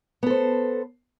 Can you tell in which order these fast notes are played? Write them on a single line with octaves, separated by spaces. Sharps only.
B3 A4 C5